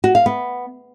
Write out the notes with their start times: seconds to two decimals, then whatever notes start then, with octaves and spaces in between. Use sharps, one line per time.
0.04 F#4
0.15 F5
0.26 B3